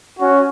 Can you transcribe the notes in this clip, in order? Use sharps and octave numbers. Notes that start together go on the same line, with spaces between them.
C#4 F#4